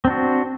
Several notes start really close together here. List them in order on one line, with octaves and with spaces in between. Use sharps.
C4 D4 F#4